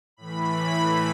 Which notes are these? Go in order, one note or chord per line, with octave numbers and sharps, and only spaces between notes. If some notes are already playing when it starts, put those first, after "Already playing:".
A2 E3 B5